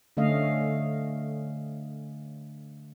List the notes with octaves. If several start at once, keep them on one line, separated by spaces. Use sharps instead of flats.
D3 A3 C#4 D#5 F5